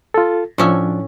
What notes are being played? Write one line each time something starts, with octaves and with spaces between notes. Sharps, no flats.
F4 A4
A2 F3 C#4 D4 E5